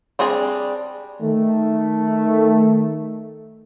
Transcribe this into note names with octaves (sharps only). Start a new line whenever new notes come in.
G3 C4 D4 G#4
D#3 A3